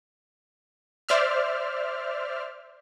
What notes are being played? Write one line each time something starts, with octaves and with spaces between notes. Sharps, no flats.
C5 D5 E5 F6